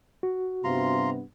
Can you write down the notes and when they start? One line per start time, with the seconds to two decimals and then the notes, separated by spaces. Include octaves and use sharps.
0.23 F#4
0.64 G2 C3 B3 F4 A#5 C6